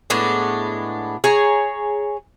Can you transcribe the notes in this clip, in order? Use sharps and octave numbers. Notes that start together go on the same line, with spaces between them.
A2 G#3 B3 D4
G#4 C#5 A#5